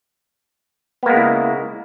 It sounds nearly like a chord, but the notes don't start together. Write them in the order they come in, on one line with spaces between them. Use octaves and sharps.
B3 A#3 G#3 C#3 E4